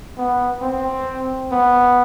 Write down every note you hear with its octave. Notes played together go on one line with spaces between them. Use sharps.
B3
C4
B3